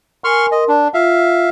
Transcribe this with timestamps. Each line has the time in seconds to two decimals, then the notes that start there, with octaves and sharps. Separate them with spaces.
0.24 A#4 G#5 C6 C#6 F6
0.52 A#4 D#5 C6
0.68 D4 A5
0.94 F4 E5 F5